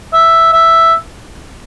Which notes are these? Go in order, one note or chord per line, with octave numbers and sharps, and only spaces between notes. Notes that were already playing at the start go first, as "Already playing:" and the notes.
E5
E5